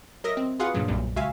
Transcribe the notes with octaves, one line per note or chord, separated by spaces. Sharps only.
F#3 A#4 D#5 E5 A#6
C4
F4 F#4 G#4 B4 F5 F#5
G2 A#2 C#3 F#3
B1 F#2 A#2 F#3 G3
C#2 F#4 E5 F5 G#5